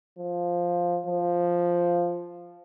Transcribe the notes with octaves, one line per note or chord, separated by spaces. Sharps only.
F3
F3